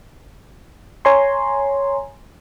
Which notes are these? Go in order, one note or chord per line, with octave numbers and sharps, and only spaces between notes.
C#5 G#5 A#5 C6